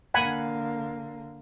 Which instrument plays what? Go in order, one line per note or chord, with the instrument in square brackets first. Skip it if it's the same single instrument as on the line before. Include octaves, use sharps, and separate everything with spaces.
[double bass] D3 A#3 [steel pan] F#5 G#5 B5